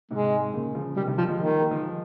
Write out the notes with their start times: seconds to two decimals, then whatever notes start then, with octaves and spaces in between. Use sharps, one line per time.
0.11 G#2 C3 G#3
0.54 A#2 C#3
0.75 C#3 F3
0.96 C3 D#3 G3
1.07 C3 D#3
1.18 D#3 F3 G3
1.29 F3 G#3
1.39 D#3 G3 A#3
1.50 G3 A#3
1.61 G3 A#3
1.71 F3 G#3